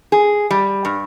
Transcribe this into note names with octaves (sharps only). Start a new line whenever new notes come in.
G#4
G3
G2